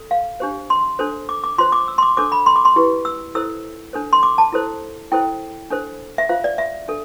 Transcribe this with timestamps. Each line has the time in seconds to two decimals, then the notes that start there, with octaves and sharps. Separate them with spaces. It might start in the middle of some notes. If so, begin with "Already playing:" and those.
Already playing: A4
0.11 F5
0.40 D4 G4 C5
0.70 C6
0.99 D4 A4 C5
1.29 D6
1.44 D6
1.58 F4 C5 C6
1.72 D6
1.88 E6
1.98 C6
2.02 D6
2.17 D4 A4 C5 D6
2.32 B5
2.46 C6
2.56 D6
2.65 C6
2.76 E4 G4 B4
3.05 E6
3.35 E4 A4 C5 E6
3.93 D4 A4 C5
4.13 C6
4.23 D6
4.38 A5
4.52 E4 A4 C5
5.12 E4 A4 C5 G5
5.70 D4 A4 C5
6.18 E5
6.29 F4 C5 F5
6.44 D5
6.58 E5
6.88 D4 A4